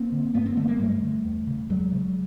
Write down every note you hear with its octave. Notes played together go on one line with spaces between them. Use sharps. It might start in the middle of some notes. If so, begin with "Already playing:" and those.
Already playing: A#3 C4
D3
G2 A3 B3
A#3 C4
D3 A3 B3
G#3 A#3
G2 G3 A3
D3
E2
C#3
E2 F#3 G#3
C#3